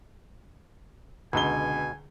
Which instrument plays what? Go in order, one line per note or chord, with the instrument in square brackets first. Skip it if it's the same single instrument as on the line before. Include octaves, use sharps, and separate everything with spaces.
[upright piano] C#2 D3 G7 [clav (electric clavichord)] B2 [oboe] G#5